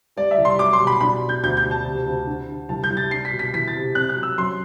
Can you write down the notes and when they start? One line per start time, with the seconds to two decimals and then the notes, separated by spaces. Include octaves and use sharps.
0.17 G3 D5
0.31 E5
0.38 C2
0.45 C6
0.59 F#3 D6
0.73 C6
0.79 B2
0.87 B5
1.00 D4 B5
1.21 B2
1.29 G6
1.43 D2 G6
1.57 G6
1.64 D2
1.71 A5
1.85 C3
2.06 D2
2.27 D3
2.48 D3
2.69 C2 A5
2.84 G6
2.90 C2
2.97 A6
3.11 D4 C7
3.25 B6
3.32 B2
3.39 B6
3.54 E3 B6
3.68 A6
3.74 C3
3.95 C4 F#6
4.09 F#6
4.16 F#3
4.23 E6
4.38 F#2 C6